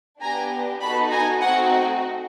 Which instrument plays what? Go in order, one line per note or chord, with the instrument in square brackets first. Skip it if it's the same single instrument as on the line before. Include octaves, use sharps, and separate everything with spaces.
[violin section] B3 D4 G4 G#5 A#5
B3 D#4 F#4 A4 A5 B5
G#5 A#5
A3 C4 D#4 F#4 F#5 G#5